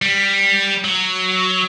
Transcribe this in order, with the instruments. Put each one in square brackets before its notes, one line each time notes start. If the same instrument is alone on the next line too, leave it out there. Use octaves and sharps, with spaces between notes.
[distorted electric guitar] G3
F#3